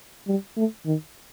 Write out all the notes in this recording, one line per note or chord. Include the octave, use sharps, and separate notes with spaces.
G3
A3
D#3